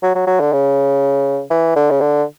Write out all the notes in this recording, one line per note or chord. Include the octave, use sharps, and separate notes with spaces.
F#3
F#3
F#3
D3
C#3
E3
D3
C#3
D3